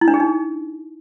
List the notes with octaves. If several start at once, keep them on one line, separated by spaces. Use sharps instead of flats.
E4
D4
G#4
D#4